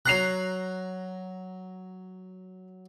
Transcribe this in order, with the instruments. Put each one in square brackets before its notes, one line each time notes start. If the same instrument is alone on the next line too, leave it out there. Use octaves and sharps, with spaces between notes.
[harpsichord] F#3 A#5 [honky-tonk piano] F#6 C7 F7